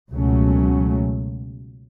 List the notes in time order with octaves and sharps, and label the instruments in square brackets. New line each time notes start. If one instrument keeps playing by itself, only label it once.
[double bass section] C#2 B2 F#3 A3 C#4